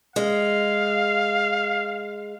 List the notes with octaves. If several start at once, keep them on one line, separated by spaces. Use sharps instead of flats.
G#3 F5